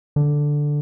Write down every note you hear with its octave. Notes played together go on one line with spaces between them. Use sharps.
D3